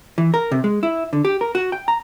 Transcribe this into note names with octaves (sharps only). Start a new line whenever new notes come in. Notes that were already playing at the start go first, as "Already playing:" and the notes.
E3
A#4
C3
G#3
E4
D3
G4
A#4
F#4
G5
A#5